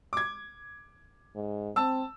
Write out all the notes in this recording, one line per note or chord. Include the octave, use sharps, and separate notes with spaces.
D6 G#6
G#2
C4 A5 E6